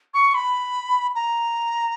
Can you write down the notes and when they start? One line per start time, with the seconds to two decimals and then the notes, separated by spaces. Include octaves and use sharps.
0.14 C#6
0.34 B5
1.15 A#5